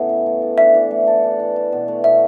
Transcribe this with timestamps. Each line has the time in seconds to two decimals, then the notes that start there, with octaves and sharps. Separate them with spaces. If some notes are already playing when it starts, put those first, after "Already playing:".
Already playing: A2 C#3 E3 A3 B3
0.09 E4
0.26 A3
0.42 A2
0.58 D4 E5
0.75 E3
0.91 A3
1.07 A4
1.24 D4
1.39 E3
1.56 E4
1.72 B2
1.88 A3
2.04 B2 E5